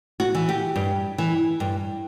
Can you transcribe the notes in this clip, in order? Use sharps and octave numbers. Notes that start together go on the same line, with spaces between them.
F#4
E3
G4
G2
E3
G2